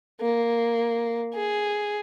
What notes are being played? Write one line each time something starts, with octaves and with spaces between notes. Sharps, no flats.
A#3
G#4